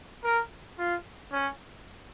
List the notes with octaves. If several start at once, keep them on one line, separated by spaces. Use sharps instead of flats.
A#4
F4
C#4